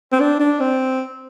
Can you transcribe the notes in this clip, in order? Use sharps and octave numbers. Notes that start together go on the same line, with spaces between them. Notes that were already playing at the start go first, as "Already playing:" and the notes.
C4
D4
D4
C4